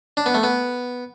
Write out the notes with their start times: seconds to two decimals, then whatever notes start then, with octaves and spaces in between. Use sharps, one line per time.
0.17 D4
0.26 B3
0.34 A3
0.43 B3